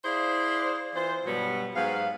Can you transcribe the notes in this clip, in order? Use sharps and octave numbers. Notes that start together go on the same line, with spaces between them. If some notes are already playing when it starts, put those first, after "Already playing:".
E4 G#4 C5 D5 F5
E3 F4 C5
G2 B2 F#3 G3 B3
G#2 F#3 B3 F5